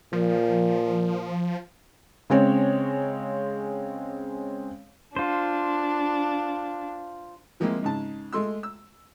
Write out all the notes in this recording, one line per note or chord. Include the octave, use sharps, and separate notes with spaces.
A#2 F3
C#3 G#3 C4 C#5
D4 F4 C5
E3 F3 G#3 A#3 C4 E4
G#2 C#3 A5
G#3 A3 C6 E6
E6